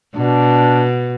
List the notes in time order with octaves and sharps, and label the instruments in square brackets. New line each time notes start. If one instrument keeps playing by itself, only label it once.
[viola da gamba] B2 [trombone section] D4